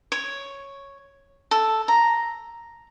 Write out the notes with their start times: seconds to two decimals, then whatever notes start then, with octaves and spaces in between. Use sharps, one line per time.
0.12 C#5
1.51 A4
1.88 A#5